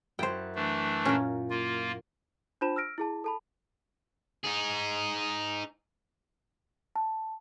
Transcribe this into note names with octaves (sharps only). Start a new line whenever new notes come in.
F#2 E4 C5 G5 F#6
E3 A3 D4
A#2 C#4 A#4
A#3 F4
D4 F4 C5 A5 B5 E7
E6 F6 A#6 D7
E4 G#4 A5
A4 A5 B5
D#4 G#4
A5